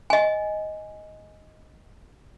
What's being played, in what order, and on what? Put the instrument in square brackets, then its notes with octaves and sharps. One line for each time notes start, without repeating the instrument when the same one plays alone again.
[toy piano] D#5 G#5